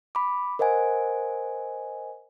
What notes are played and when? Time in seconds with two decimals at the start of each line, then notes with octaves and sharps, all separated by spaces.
0.15 B5 D6
0.59 A#4 C5 D#5 F#5 G#5